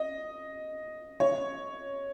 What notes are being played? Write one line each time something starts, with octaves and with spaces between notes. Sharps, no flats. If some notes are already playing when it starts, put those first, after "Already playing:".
Already playing: D#5
C#5